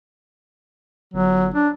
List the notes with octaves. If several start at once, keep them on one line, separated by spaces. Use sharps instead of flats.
G1 F#3
D4